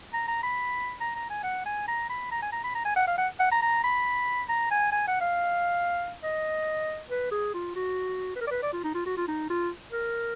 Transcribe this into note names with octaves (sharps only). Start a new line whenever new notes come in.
A#5
A#5
B5
A#5
A#5
G#5
F#5
G#5
A#5
B5
A#5
G#5
A#5
B5
A#5
G#5
F#5
F5
F#5
F#5
A#5
A#5
B5
A#5
G#5
G#5
F#5
F5
D#5
B4
G#4
F4
F#4
B4
A#4
D5
B4
D5
F4
D#4
F4
F#4
F4
D#4
F4
A#4